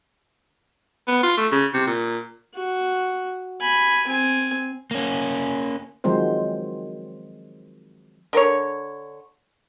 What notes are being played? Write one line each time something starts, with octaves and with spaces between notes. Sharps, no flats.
B3
F4
A3
C#3
C3
A#2
F#4
G#5 B5
C4 G#5
A#3 C#4
D#3 F3 F#3 G#3 C4 C5
D3 A#4 C5 C#5